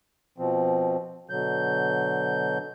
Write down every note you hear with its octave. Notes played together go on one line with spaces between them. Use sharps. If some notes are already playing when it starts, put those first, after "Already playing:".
B2 F3 C4
B2 D3 F#3 G6